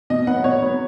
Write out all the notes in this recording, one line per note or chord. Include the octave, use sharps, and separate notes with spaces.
B2 D#5
F#3 B3 F#5
B2 C#5
F#3 B3